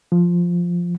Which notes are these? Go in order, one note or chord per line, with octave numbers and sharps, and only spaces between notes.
F3